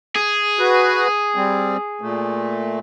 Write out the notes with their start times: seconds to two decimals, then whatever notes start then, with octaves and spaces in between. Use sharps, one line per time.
0.16 G#4
0.59 F#4 B4
1.35 G3 C4
2.01 A#2 A3